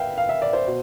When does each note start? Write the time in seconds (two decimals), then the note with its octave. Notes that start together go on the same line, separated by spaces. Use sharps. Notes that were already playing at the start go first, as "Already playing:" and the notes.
Already playing: B4 E5 F5 G5
0.18 F5
0.29 E5
0.42 D5
0.53 C5
0.67 B2